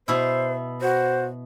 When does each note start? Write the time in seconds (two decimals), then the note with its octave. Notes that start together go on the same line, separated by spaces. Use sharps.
0.08 B2 E4 C5
0.82 F#4 C5